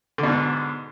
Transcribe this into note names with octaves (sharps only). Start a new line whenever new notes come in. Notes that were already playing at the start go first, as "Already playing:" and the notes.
G#2 B2 D3